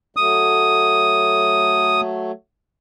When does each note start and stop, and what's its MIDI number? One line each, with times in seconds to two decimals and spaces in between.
0.17 2.32 54
0.17 2.32 57
0.17 2.01 87